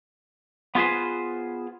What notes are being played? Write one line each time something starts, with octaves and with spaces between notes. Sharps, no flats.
B3 F4 G#4 B4 C5